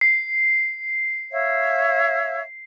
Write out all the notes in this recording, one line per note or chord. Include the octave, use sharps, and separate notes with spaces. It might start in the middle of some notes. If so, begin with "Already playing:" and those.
C7
C#5 E5 F5